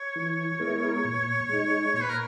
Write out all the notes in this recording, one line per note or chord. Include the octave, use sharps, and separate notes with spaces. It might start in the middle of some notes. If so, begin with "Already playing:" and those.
Already playing: C#5
E3
G#3 B3 E4 A#4
A#2
G#3 D#4
A#2 C#5
B4
A#4